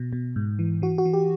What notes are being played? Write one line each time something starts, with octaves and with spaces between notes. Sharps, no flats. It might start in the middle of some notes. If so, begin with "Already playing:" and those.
Already playing: B2
B2
G#2
E3
E3 F#4
F#4
E3
G4